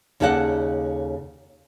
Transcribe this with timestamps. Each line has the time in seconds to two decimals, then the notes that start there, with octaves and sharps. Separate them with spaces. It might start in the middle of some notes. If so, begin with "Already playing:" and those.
0.20 D#2 C#3 D#4 A4 D5 F#5